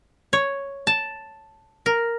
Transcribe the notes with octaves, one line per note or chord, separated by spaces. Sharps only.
C#5
A5
A#4